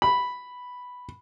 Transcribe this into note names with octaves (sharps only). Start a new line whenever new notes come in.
B5